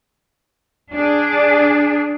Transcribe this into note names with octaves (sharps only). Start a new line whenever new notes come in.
D4 G#4